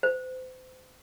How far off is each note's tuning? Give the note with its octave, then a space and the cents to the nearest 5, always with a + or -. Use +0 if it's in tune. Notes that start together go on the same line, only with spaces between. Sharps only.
C5 -35